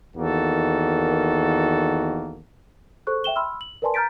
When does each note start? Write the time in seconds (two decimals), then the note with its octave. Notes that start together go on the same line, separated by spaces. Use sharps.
0.17 E2 D#3 A#3 F#4 A4
3.07 G#4 A4 C5 C#6 F#6
3.24 E5 G5 E7 G7
3.36 B5 C6 E6 F6
3.61 F#7
3.82 A#4 B4 D5 G#5 A5 C6
3.94 A#5 F6 G6 A6 B6 D7